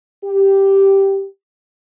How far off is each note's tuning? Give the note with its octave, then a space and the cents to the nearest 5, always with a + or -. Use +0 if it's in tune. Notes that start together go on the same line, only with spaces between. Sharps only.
G4 -5